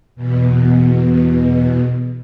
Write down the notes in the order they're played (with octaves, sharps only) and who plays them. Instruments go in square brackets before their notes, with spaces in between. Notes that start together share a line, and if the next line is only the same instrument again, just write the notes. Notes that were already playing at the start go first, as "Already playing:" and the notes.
[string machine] E2 B2